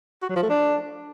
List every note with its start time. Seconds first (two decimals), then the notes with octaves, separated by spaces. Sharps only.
0.22 F#4
0.29 F#3
0.36 F3
0.43 A3
0.50 D4